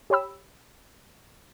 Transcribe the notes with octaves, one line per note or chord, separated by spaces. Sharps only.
G4 C#5 G5 B5 E6